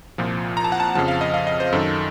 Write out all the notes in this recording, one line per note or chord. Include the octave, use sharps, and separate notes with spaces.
C2 A#2 F3
A#5
A5
F#5
A5
F2 C#3 F3 A5
F5
D#5
F5
D#5
C5
F#2 D#3 A4